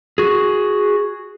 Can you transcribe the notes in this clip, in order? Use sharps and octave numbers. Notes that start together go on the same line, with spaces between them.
F#4 G#4